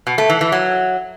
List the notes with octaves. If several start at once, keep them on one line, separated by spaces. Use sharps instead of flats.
B2
A3
E3
E3
F#3